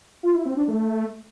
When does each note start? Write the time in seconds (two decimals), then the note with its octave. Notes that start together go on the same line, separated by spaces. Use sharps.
0.23 F4
0.34 E4
0.46 C4
0.57 D4
0.68 A3